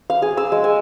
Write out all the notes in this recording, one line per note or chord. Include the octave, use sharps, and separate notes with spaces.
F5
G#4
E6
G#3
G#5